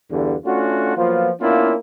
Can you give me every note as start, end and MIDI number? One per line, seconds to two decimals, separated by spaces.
0.11 0.35 40
0.11 0.35 43
0.11 0.35 50
0.46 0.92 57
0.46 0.92 61
0.46 0.92 62
0.46 0.92 65
0.46 0.92 66
0.97 1.30 53
0.97 1.30 54
0.97 1.30 58
0.97 1.30 59
0.97 1.30 65
1.41 1.74 58
1.41 1.74 59
1.41 1.74 61
1.41 1.74 62
1.41 1.74 64
1.41 1.74 65